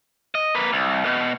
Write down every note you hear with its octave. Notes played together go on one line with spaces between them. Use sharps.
D#5
A#3 B4
C2
B2